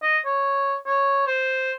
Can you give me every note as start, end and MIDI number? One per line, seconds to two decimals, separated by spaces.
0.03 0.18 75
0.26 0.75 73
0.87 1.24 73
1.27 1.72 72